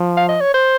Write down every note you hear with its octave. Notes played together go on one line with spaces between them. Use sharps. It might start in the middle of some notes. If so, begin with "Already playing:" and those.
Already playing: F3
F5
D#5
C#5
C5